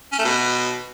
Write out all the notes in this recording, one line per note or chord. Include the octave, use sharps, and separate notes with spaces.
C#4
A3
B2